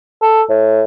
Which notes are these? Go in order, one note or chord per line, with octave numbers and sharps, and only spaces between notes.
A4
A2